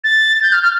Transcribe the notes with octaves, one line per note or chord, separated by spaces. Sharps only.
A6
G6
F6
F6